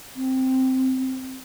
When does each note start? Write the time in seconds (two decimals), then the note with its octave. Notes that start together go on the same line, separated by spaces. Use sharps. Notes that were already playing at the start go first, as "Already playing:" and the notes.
0.16 C4